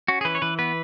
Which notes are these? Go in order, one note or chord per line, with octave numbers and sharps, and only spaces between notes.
C#4 F#4
G#4
E3 B4
C#5
E3 B4
B3 B4